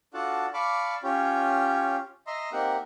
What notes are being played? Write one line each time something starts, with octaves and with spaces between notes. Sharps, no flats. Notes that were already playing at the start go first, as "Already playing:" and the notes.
D4 F4 F#4 A4 F#5 A5
D5 F5 A5 B5 C#6 D6
C#4 F4 G4 C#5
D#5 E5 A#5 C6
A#3 C4 D#4 G4 A#4 F#5